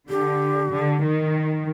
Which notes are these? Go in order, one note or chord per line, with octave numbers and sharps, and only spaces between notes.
D3 G4
D3
D#3